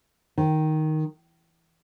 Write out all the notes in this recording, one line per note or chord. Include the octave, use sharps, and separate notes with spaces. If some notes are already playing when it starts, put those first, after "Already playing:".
D#3